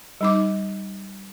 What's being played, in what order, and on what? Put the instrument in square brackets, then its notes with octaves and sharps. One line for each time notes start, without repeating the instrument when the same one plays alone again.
[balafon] G3 D#4 D6